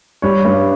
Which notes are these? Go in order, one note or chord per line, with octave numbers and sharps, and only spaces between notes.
G3 C#5
G2